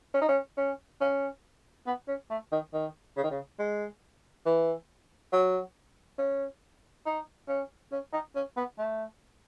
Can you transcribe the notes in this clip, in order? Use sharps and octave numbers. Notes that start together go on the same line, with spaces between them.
C#4
D#4
C#4
C#4
C#4
B3
C#4
A3
D#3
D#3
C#3
D#3
C#3
G#3
E3
F#3
C#4
D#4
C#4
C#4
D#4
C#4
B3
A3